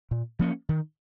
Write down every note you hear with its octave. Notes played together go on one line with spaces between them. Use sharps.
A#2
F3 A#3 C#4
D#3